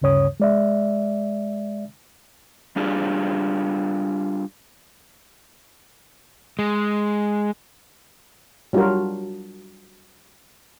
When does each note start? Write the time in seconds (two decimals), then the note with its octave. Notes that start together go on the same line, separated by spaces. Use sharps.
0.02 D2 G2 C#3 C#5 D#6
0.40 G#3 D5 E5
2.76 G3 D4 F4 G4 G#4
6.59 G#3
8.73 F#3 G3 D4 F4 F#4 A#4